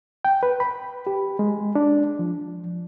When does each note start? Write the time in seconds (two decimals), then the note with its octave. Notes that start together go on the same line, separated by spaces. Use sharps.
0.25 G5
0.43 B4
0.60 B5
1.07 G4
1.39 G#3
1.75 D4
2.19 F3